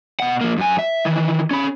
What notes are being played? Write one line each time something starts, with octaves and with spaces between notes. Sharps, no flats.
B2 F#5
F3 A#3
F#2 G#5
E5
D#3 E3
C#4 B5